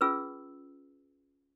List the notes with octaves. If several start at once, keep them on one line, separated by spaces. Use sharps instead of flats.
C#4 F4 G#4 B4 E6